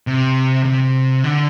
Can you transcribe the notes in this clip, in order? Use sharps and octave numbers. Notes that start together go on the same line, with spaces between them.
C3
C3
D3